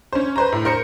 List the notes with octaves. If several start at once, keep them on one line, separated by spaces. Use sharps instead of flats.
C#4 C5
B4 C5 A#5
A2
A#4 C5 C#7